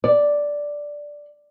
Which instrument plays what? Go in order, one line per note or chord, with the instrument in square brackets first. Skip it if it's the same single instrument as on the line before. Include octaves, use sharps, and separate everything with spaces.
[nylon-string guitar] D5